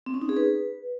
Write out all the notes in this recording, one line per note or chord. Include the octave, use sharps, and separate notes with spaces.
C4
C#4
D#4
G#4
B4